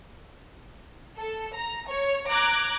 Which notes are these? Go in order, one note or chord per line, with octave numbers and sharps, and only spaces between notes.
A4
A#5
C#5
A#5 D6 F#6 G#6